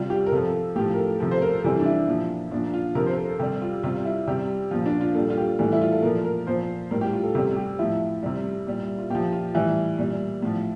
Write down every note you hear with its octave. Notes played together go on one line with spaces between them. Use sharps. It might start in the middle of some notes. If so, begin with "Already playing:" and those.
Already playing: C3 G3 F4
G4
A#4
C3 F3 A4
A2 F3 G4
A#4
A4
C3 F3 A4
C5
A#4
A4
C3 E3 G3
D4
E4
A#2 F3
A#2 F3 D4
F4
C3 F3 A#4
C5
A4
A4
C3 G3 G4
F4
C3 G3 F4
E4
C3 G3 G4
A#2 F3 F4
D4
F4
A#2 G3 A4
F4
G4
A2 E3 G3 A4
E4
F4
A4
A#2 F3 A#4
A#4
A#2 F3 C5
A2 G3 A#4
G4
F4
A4
C3 G3 G4
G4
A2 F3 E4
C3 G3
A#2 G3
F4
A#2 F3 G4
F4
A2 E3 G3 E4
A#2 G3
A2 F3